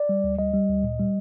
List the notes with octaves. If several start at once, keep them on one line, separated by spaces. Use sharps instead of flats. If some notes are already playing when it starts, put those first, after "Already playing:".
Already playing: D5
G3
D2
G3 D#5
G3
D2
A#2
G3